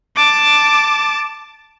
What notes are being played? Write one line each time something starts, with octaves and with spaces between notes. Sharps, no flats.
A5 D6